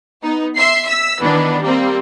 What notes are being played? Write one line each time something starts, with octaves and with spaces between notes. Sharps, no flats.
B3 D#4
E5 C6 C7
E6 B6
D#3 E3 B3 D4
G3 A#3 C4